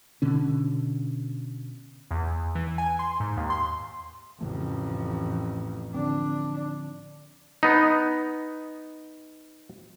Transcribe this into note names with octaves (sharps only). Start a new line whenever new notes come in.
B2 D3 C#4
E2
E3
G#5
C6
G#2
D#2
C6
A1 F2 C#3 E3 A3
D3 F3 C4 D4
B3 D#4